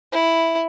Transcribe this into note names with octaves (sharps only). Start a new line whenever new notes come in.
E4